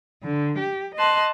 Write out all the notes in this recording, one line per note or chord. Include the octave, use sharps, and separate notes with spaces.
D3
G4
D#5 A5 C6 F#6